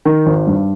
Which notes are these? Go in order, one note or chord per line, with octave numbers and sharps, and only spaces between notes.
D#3
G#1
G2